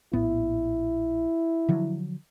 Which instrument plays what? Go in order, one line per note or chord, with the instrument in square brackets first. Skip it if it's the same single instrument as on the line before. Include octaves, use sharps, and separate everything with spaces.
[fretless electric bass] A#1 A2 B3 [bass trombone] E4
[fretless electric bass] D3 F3 F#3